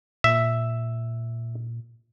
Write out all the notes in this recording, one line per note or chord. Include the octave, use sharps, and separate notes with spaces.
A#2 E5